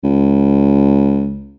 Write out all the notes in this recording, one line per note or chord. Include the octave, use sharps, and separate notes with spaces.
C#2